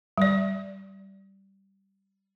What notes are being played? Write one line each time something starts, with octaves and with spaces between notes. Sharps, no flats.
G3 D5